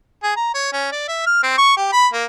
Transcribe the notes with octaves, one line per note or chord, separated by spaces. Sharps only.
G#4
A#5
C#5
C#4
D5
E5
F6
C4
C#6
G4
B5
A#3